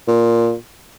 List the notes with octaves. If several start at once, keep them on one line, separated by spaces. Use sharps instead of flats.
A#2